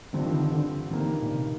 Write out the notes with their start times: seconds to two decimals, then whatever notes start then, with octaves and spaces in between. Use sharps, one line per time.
0.13 G2 D3 F3 C4
0.26 D#3
0.39 D3
0.53 D3
0.91 G2 D#3 A#3
1.22 A#2
1.30 C3